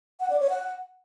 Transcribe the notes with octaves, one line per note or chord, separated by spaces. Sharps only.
F#5
D5
C#5
F#5